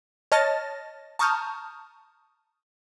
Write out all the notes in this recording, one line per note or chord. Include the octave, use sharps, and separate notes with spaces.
C#5 D#5 A5 F6 A6 A#6
A5 A#5 C#6 D#6 F6 G6